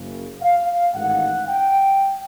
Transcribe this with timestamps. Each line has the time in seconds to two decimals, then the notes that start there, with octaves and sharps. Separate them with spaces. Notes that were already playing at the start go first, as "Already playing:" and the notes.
Already playing: F#1 F#2 C#3
0.42 F5
0.94 A1 G#2 D#3 F#5
1.47 G5